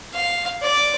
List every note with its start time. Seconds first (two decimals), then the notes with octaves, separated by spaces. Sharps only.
0.14 F5
0.62 D5